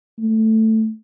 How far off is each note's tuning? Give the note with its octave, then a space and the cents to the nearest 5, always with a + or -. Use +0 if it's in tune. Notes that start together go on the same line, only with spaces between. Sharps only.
A3 +5